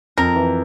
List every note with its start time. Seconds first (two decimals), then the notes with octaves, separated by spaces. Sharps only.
0.18 F2 A#4
0.36 E3